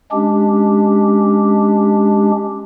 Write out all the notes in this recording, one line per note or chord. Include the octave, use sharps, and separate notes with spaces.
G#3 C#4 D4 G4